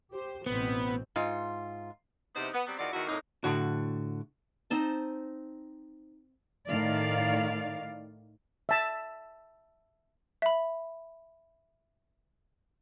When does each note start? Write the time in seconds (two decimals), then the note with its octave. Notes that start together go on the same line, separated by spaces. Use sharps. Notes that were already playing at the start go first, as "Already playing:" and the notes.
0.12 G4 C5
0.46 A1 B2 B3 C4
1.16 G#2 F4
2.34 E2 C3 B3 D#4 C5
2.53 B3
2.66 F#3 G3 B3 C4
2.78 E2 D#3 F4 F#4 D5
2.92 E2 D#3 E4 F#4
3.07 F2 A2 A#3 D#4
3.44 A2 D3 F#4
4.70 C4 D#4 C5 A5
6.68 A2 D#3 D5 F5
8.69 E5 A5
10.42 E5 B5